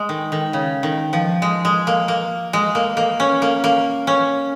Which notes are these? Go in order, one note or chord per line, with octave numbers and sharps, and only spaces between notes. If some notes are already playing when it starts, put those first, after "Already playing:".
Already playing: G#3
D#3
D#3
C#3
D#3
F3
G#3
G#3
A#3
A#3
G#3
A#3
A#3
C#4
A#3
A#3
C#4